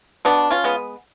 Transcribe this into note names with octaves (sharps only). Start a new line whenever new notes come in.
B2 B3 D4
C#4 F4
G#3 B3